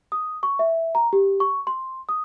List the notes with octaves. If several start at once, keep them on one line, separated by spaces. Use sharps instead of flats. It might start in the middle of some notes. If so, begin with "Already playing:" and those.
D#6
C#6
E5
A#5
G4
C#6
C6
D#6